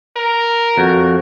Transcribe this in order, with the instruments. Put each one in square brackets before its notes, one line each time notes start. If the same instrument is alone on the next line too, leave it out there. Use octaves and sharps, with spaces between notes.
[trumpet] A#4
[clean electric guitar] F2 [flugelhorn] F#4